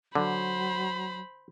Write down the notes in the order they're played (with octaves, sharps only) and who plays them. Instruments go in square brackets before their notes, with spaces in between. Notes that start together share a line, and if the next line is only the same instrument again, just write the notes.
[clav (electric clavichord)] D3 [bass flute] F#3 [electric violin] C5 B5